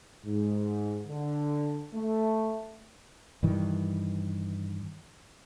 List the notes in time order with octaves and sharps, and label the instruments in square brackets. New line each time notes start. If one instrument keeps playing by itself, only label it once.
[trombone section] G#2
D3
A3
[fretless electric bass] G2 D#3 E3